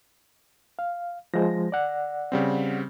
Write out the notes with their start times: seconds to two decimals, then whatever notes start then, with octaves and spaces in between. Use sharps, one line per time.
0.79 F5
1.34 F3 G#3 C5 A#6
1.72 D5 F#5
2.32 C#3 G3 C4